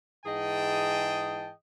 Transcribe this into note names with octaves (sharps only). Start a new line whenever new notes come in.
G#2 E3 G#4 D#5 G5 A5